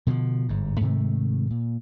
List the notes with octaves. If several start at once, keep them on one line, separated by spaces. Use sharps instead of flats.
B2 D3 E3 F3
G1 G#2
G#2 C3 D#3 A3
A#2